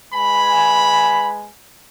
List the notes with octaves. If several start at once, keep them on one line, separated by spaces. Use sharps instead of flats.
G#3 B4 G#5 B5